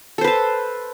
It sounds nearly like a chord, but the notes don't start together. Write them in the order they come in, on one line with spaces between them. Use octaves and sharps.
A4 C5 B4 A5